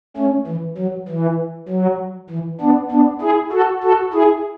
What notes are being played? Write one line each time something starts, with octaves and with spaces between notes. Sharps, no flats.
A3 C#4
E3
F#3
E3
F#3
E3
B3 D4
B3 D4
E4 G#4
F#4 A4
F#4 A4
E4 G#4